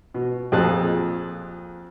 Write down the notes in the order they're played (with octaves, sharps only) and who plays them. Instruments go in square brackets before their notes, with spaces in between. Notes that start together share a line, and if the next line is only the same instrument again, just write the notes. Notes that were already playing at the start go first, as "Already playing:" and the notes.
[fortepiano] B2
F2 A#2 G#4 A4 A5 F#6